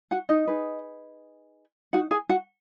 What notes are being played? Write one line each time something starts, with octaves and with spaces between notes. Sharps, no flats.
F#4 F#5
D#4 D#5
D#4 G#4 B4
D#4 F#4 F#5
G#4 G#5
F#4 F#5